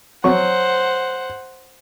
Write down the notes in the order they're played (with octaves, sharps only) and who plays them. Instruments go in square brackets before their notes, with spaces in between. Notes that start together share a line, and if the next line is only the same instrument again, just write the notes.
[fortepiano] F#3 C#6 [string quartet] C5 F#5